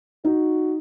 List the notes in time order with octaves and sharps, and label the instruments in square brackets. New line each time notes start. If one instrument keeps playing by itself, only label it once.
[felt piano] D#4 [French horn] F#4